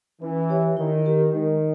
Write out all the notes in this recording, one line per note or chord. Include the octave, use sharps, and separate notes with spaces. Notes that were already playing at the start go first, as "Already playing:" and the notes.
E3 C#4
G4 C#5 E5
D#3 E4
G4 A#4
D#3 G#3